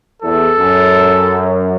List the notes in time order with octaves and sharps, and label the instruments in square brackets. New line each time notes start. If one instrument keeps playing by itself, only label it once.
[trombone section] E2 [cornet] A4
[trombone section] F#2